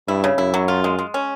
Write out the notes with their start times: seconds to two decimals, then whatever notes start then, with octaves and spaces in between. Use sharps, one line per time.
0.08 G2 E4
0.24 C#3
0.38 F#2 E4
0.54 F#3
0.68 F4
0.84 G#3
0.99 G#3
1.14 C#4